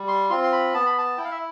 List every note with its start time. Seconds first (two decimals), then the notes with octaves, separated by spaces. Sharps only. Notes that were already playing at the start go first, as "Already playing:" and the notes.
Already playing: G3
0.08 C6
0.30 C4 F4 C6
0.44 C6
0.52 B5
0.74 B3 A5
0.86 B5
0.98 A5
1.18 E4 G5
1.24 F5
1.31 E5